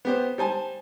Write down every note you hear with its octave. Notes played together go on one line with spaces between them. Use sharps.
B3 G4 C5
G3 C5 G#5 A5